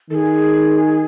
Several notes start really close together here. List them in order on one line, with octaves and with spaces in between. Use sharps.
D#3 A4 G#4